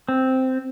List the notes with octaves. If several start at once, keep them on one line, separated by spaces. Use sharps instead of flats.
C4